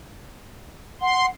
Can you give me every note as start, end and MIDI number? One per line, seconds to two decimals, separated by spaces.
1.01 1.29 78
1.01 1.26 84